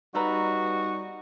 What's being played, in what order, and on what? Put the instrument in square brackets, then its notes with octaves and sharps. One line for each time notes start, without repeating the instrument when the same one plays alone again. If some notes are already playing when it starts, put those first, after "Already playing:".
[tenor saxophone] G3 [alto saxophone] D#4 [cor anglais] F#4 [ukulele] A4 B4 A#5